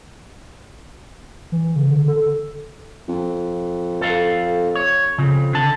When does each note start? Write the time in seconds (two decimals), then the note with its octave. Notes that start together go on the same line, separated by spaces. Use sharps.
1.52 E3
1.76 C#3
1.91 D3
2.08 A4
3.08 F2
4.01 A4 F5
4.75 C#5
5.18 F2 C#3
5.53 D3 A5